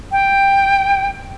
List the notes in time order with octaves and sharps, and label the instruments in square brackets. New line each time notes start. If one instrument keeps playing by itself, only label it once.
[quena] G5